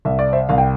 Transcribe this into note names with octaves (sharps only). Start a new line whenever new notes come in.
C2 E5
D5
C5 E5
C2 F5
G5